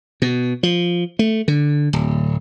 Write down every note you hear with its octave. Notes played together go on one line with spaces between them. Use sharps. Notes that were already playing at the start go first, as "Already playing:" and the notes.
B2
F3
A3
D3
D1